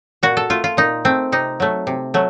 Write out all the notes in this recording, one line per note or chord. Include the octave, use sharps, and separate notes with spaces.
A#2 F#4
A4
A3 F4
F4
A#2 D#4
A3 C4
C3 D#4
F#3 A3
C3
F#3 A3